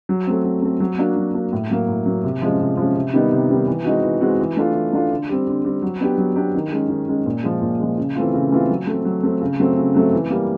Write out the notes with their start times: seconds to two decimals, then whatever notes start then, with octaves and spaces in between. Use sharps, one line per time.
0.09 F#3
0.27 A3 C4
0.44 F#3
0.62 A3 C4
0.80 F#3
0.98 A#3 D4 F#4
1.17 F#3
1.34 A#3 D4 F#4
1.53 A2
1.70 F#3 A#3
1.88 A2
2.06 F#3 A#3
2.24 C3
2.42 F3 G#3 C#4
2.60 C3
2.77 F3 G#3 C#4
2.95 C3
3.13 D#3 G3 B3 D#4
3.32 C3
3.50 D#3 G3 B3 D#4
3.67 E3
3.85 G#3 C4 D#4 F#4
4.03 E3
4.21 G#3 C4 D#4 F#4
4.40 E3
4.57 A3 D4 F4
4.74 E3
4.93 A3 D4 F4
5.11 D3
5.29 G3 C4
5.47 D3
5.65 G3 C4
5.82 F#3
6.00 B3 D4 G4
6.18 F#3
6.36 B3 D4 G4
6.55 D#3
6.72 G#3 C#4
6.90 D#3
7.08 G#3 C#4
7.26 A#2
7.43 F3 G#3
7.62 A#2
7.80 F3 G#3
7.98 C#3
8.15 E3 A3 C4 F4
8.34 C#3
8.52 E3 A3 C4 F4
8.69 F#3
8.87 A3 C4
9.05 F#3
9.23 A3 C4
9.42 C#3
9.60 F#3 A3 C4
9.77 C#3
9.94 F#3 A3 C4
10.13 E3
10.30 G3 A#3